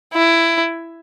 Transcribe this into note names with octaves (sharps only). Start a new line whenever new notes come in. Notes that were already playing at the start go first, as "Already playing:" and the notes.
E4